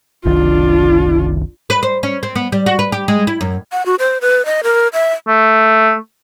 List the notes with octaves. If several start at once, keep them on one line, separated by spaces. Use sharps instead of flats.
F#1 C2 D#3 D4 F4
B4
C5
C#4
C4
B3
G3
F#4
B4
G4
G#3
E4
F#2
F#5
F#4
C5
B4
D#5
A#4
E5
A3